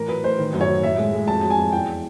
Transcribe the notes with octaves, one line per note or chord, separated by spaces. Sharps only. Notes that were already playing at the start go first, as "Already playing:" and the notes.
Already playing: A2 E3 A#4
F#3 B4
A2 C5
D#3
F#2
C#5
F#3
A2 E5
G#3
G#3
F2 A5
F#3
G#5
F2
E2 G5